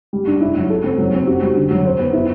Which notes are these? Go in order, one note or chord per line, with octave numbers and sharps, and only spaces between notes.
G3
D4
E4
F#3
A4
C4
F#3
C4
F#4
G3
D3
F#3
C5
B3
E4